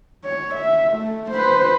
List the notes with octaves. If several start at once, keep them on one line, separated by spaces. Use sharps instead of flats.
C#5
E5
A3
B4 C5